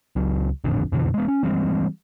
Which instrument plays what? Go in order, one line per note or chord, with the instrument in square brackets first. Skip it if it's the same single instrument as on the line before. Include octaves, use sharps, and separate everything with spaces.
[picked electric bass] C#2 F#3
D#1 A1 F2 D3
F2 B2 D3 E3
G#3 B3
C#4
E3 G3 G#3 C4